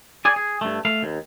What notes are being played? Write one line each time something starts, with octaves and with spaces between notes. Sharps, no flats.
G#4 D5 G#5
G#4
G2 A3
A3 F5
D#2